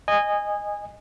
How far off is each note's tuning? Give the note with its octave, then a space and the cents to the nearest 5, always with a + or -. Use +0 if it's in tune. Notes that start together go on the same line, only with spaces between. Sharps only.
D#5 -15 G#5 -15